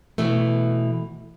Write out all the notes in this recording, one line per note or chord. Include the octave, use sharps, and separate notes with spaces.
B2 E3 A3